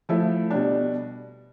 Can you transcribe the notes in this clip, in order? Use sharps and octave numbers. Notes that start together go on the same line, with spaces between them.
F3 A3 E4
B2 G3 D4